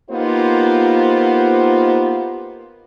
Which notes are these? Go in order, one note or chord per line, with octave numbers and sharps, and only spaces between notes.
A#3 B3 D#4 F4 G4 C5